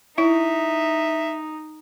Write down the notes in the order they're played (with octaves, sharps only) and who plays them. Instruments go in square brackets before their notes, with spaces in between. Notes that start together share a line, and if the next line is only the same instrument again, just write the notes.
[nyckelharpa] D#4 [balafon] E4 [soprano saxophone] E5